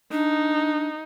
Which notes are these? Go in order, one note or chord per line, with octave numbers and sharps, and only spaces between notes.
D4 D#4